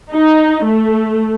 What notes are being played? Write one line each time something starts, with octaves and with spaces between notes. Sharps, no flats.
D#4
A3